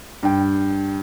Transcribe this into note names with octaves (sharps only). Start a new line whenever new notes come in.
G2 G5